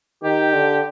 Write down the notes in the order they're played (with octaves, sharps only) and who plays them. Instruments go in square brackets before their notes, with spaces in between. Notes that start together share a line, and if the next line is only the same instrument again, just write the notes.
[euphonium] D#3 [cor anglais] G4
[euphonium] D3